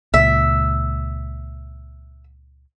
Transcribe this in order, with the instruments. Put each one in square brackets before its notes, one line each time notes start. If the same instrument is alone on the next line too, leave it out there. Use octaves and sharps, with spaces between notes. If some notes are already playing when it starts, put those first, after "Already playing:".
[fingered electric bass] C#2 A#2 [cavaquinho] E5